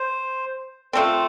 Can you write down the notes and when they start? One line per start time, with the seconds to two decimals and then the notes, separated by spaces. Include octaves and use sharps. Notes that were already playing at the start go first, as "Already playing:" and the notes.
Already playing: C5
0.93 F3 A3 C4 C5